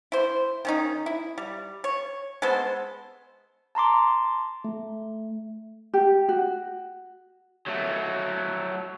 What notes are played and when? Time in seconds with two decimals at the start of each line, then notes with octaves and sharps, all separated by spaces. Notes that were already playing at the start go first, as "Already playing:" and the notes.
0.12 E4 C5
0.65 D#3 C#4 D#4
1.06 E4
1.38 G3
1.84 C#5
2.42 G#3 B3 A4 C5
3.75 A5 A#5 C6 D6
4.64 A3
5.94 G4
6.29 F#4
7.67 F#3 A3